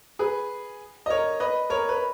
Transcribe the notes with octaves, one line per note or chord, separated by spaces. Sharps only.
G#4 B4
D#5
A#4 C#5
B4 D#5
A#4 C#5
B4